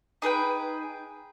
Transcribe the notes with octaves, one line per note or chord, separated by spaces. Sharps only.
D#4 G#4 B4 G5